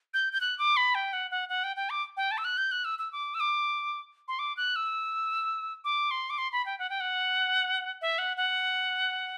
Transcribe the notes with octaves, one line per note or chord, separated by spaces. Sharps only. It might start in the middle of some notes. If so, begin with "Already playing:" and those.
G6
G6
F#6
D6
B5
G5
F#5
F#5
F#5
G5
G5
D6
G5
A5
E6
F#6
G6
F#6
E6
E6
D6
E6
D6
C6
D6
F#6
E6
D6
C6
D6
C6
B5
G5
F#5
G5
F#5
E5
F#5
F#5